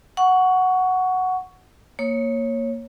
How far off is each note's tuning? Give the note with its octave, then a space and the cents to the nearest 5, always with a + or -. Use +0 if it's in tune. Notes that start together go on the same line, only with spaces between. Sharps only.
F#5 +0 C#6 +15
A#3 +0 C#5 -10